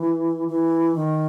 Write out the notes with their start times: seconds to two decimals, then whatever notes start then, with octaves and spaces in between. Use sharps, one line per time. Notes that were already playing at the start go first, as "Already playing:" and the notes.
Already playing: E3
0.48 E3
0.95 D#3